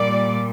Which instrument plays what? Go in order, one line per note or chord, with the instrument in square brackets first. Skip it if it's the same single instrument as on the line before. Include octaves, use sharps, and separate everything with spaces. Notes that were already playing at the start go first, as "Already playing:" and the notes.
Already playing: [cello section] A#2 G3 D5